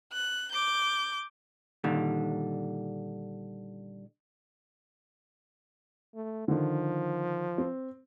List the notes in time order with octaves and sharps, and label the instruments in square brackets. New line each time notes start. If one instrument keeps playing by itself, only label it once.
[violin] F#6
D6 G6
[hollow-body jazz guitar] A#2 D3 D#3 G3
[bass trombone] A3
[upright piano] D3 D#3 [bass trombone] F3
[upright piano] C4